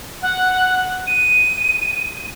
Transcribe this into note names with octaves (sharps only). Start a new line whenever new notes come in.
F#5
D#7